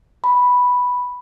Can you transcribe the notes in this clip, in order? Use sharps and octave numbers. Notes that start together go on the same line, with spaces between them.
B5